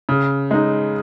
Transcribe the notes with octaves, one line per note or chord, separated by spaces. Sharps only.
C#3
G#3 D#4